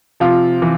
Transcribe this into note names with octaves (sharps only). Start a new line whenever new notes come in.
C3 F3 F4
E3